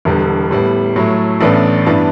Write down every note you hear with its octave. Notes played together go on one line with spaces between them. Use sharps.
E1 E2 D3 G3 B3
A2 G3 B3
A2 F#3 A3
A1 A2 E3 B3 D4
G2 E3 B3 D4